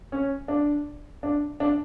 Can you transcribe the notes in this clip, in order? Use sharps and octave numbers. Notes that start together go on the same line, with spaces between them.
C#4
D4
D4
D4